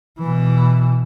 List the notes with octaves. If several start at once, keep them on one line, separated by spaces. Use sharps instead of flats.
B2 E3